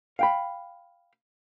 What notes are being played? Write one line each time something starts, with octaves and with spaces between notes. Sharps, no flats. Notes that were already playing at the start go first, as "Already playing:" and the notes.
F5 G5 B5